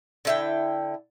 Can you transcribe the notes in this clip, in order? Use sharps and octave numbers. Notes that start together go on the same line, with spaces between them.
D3 E4 G5